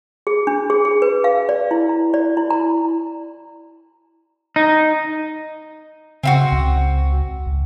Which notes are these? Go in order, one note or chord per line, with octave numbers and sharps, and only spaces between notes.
G#4
D4
G#4
G#4
B4
F5
D5
E4
A#5
D5
E4
A#5
D#4
C#3 C4 E4 F#4
C#2
C#2